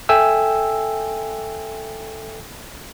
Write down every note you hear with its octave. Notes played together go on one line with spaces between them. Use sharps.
A4 E5 G5 G#5 E6